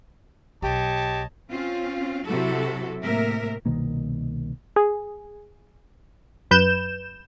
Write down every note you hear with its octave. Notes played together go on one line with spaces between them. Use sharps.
B1 G4 C#5 D#5 A5
C4 C#4 F4
C3 F#3 E4 F#4 A4
A2 C3 A#3 A#4 E5
C2 B2 D#3 A#3
G#4
F#2 B4 G6 E7